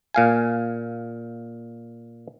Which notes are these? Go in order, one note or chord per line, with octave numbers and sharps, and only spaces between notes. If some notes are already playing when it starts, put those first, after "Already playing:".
A#2 F5 G#5